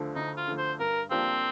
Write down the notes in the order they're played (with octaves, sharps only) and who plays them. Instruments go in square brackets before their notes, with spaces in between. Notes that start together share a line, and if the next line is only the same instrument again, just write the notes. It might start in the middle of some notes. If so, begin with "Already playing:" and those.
Already playing: [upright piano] D2 D3 F3 A3
[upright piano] D2 [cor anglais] D#4
[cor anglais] F4
[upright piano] D3 F3 A3
[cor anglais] C5
[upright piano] G2 [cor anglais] A#4
[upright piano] F3 A#3 D4 G4 [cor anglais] C4